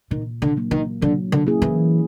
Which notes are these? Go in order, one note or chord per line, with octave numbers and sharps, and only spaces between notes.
A#2 D#3
D3
F#3 A#3
D#3
D3 F#3
D3
A#3 C#4 E4 G#4
E3